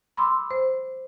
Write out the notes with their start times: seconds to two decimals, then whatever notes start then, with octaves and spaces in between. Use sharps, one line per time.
0.17 B5 C6 D6 E6
0.51 C5